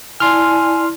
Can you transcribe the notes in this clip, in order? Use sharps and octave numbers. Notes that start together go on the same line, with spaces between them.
E4 D5 G#5 A5 C6 F6